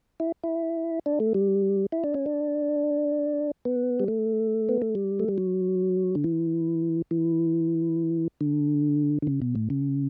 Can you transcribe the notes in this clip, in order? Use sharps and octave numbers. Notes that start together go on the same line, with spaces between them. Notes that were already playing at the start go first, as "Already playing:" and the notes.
E4
E4
D4
A3
G3
E4
D4
C#4
D4
B3
G3
A3
B3
A3
G3
A3
G3
F#3
D3
E3
E3
D3
D3
C#3
B2
A2
C#3